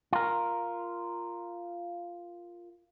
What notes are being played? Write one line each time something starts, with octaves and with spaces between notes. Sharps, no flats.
F4 A#4